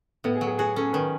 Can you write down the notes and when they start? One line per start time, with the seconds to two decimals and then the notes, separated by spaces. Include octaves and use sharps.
0.24 A2 B3
0.36 G#4
0.41 F#3
0.47 G#4
0.58 F#4 G#4
0.76 C#4 A4
0.93 D#3 B4